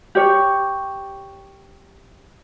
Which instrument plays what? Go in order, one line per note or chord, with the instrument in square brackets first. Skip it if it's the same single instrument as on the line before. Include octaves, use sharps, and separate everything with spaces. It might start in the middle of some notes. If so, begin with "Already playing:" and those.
[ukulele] G4 C#5